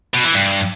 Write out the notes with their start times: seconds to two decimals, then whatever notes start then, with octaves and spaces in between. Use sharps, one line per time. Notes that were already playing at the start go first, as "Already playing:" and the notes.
0.14 B2
0.24 E3
0.34 G2